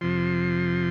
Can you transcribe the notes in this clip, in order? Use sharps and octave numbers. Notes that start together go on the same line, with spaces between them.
F2 C3 F3 C6